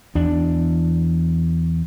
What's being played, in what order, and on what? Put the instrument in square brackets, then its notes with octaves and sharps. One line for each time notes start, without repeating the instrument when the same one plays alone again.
[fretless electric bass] E2 D4